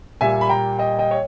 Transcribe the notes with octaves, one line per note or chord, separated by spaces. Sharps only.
A#2 G3 A#3 E5 G#5
B5
G5 A#5
D#5 G5
D#5 G5
C#5